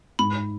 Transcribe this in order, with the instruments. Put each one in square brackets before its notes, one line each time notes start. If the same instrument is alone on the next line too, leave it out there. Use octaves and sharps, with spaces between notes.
[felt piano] G#2 [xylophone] B5